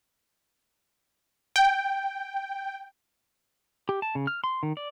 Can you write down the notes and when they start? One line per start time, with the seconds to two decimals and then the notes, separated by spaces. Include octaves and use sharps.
1.56 G5
3.89 G4
4.02 A5
4.15 C#3
4.27 F6
4.44 C6
4.63 D#3
4.77 D5